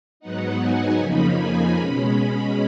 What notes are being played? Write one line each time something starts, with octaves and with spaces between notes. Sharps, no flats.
G#2 F#3 B3 D#4 F#5
G#5
F2 C#3 F3 A#3 D#4 B5
G#5
B2 G#3 C#4 B5